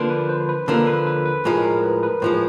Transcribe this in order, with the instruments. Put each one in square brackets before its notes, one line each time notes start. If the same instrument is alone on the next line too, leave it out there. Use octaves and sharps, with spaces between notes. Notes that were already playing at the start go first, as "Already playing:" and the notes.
Already playing: [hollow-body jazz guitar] D3 F3 A#3 D4 [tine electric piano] B4
[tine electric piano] B4
C5
B4
[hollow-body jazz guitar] D3 F3 A#3 D4 [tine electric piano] A4
[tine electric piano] B4
B4
B4
[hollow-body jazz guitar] A2 F3 G#3 [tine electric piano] A#4
[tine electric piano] A#4
B4
B4
[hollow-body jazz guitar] A2 F3 G#3 [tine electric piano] C5